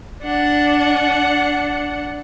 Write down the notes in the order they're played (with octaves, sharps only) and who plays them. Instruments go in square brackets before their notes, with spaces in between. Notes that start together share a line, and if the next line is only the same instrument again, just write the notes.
[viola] D4 F#5